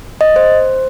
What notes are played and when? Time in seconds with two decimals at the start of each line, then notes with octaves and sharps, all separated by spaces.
0.21 D#5
0.36 C5